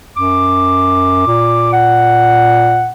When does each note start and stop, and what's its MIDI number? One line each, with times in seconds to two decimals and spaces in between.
0.17 1.23 42
0.17 1.71 86
1.27 2.92 46
1.73 2.91 78